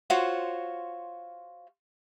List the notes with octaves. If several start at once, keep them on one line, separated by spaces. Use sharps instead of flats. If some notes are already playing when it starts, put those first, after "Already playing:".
F4 F#4 C5 C#5